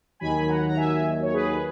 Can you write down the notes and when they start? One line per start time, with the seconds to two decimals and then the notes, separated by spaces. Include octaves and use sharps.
0.20 D#2 D#3 F#3 G#5 B5
0.49 F#5 A#5
0.69 A#5
0.77 E5 G#5
1.23 C#5
1.34 G#4 B4